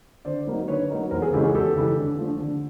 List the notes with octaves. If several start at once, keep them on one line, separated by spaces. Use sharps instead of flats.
D3 C5 D5
F#3 A#3 D#4
D3 B4 C#5
F#3 A#3 D#4
E2 A#4 C5
G#4 A#4
C#3 E3 G#3 C#4 G4 A4
F#4 G#4
E2 G4 A4
C#3 E3 G#3 C#4
D3
F3 A3 D4
D3